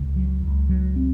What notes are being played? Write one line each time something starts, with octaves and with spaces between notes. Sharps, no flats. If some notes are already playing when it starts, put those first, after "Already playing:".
Already playing: C#2 C#3
F#3
C#2
F#3
C4